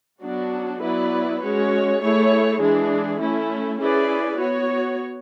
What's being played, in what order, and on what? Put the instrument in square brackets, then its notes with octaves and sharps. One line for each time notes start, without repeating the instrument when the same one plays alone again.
[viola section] F#3 B3 D4 F#4
F#3 B3 E4 B4 D5
G#3 C#4 F#4 C#5
A3 E4 G#4 C#5
E3 G#3 D4 G#4
A3 C#4 E4
C#4 E4 G#4 B4 D5
B3 F#4 C#5